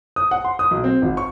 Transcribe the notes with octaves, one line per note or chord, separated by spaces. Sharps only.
D#6
F#5
C6
D#6
B1
C4
G#1
C#6